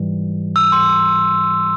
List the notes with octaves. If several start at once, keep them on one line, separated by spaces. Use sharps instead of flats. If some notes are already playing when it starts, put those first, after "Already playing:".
Already playing: G#2 E3 G3
E6
C6